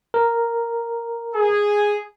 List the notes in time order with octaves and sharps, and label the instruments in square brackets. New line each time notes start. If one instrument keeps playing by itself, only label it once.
[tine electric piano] A#4
[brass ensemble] G#4